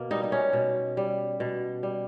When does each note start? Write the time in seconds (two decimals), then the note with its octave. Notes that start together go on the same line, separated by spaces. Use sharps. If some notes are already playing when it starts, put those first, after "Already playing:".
Already playing: B2 A#3
0.11 G3 D#4
0.23 D#4
0.32 C#4
0.53 B2
0.97 G3
1.40 B2
1.83 G3